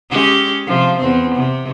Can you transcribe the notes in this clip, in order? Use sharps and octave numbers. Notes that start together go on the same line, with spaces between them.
G#3 C#4 G4
C3 F3
E2 C4
C3